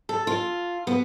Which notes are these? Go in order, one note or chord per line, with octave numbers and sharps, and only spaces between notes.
A4
F4
B3